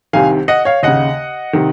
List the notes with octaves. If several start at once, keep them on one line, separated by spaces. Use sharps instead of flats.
C2 C3 D#3 F5 G#5
D#5 F#5
C#5 F5
D#2 C#3 D#5 F#5
C3 D#3